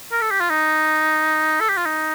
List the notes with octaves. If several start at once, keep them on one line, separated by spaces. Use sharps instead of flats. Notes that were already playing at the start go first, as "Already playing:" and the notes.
A#4
A4
G4
F4
D#4
A4
G4
F4
D#4